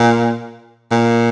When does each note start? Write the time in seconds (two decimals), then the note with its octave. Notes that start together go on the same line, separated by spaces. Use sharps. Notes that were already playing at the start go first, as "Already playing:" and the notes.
Already playing: A#2
0.91 A#2